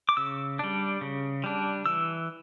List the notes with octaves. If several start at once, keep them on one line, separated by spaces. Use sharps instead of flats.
D6
C#3 E6
G3 D4
C#3
G3 D4
E3 E6